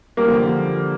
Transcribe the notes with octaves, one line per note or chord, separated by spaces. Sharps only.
G3 A#3
F3
D3